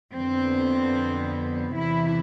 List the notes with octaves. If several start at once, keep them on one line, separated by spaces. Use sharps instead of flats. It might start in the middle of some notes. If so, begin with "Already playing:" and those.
F2 D3 F3 B3 C4
E2 C3 E3 E4